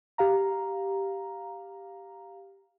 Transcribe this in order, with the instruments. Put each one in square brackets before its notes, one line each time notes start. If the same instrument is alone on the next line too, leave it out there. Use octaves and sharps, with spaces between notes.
[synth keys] G4 F5 A#5